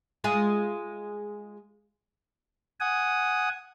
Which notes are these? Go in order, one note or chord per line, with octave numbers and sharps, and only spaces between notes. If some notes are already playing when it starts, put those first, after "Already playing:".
G#3 F4 G#4
F#5 G#5 D#6